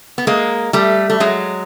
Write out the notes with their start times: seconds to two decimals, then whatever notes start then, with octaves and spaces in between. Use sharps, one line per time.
0.18 B3
0.27 G#3 A#3
0.73 G3 A3
1.10 A3
1.20 F#3 G#3